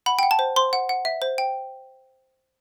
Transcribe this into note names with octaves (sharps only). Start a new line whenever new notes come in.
F#5 B5
G5
F#5
A5
C5
C5 C6
F#5
F#5
E5
C5
G5